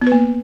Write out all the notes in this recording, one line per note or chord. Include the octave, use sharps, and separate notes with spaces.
B3
B4
A#3